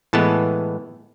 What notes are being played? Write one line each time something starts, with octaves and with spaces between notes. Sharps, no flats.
A2 E3 G#3 B3 A5